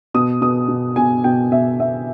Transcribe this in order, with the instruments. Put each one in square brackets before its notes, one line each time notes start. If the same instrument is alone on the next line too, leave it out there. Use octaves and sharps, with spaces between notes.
[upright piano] B2 D#6
B2 D#6
B2
B2 G#5
B2 G5
B2 E5
B2 E5